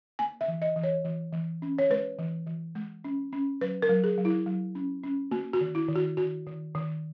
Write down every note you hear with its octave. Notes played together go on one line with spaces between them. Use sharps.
A#3 G#5
E5
E3
D#5
E3
C#5
E3
E3
C#4
C#5
G#3 B4
E3
E3
G#3
C#4
C#4
F#3 B4
A#4
F#3
G#4
F#3
E4
F#3
C#4
C#4
A#3 F#4
F#4
D#3
E4
D#3
F#4
D#3 F#4
D#3
D#3